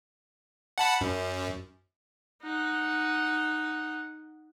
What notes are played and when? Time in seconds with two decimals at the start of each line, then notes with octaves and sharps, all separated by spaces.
0.78 F#5 A5 B5
1.01 F#2
2.43 D#4 F#5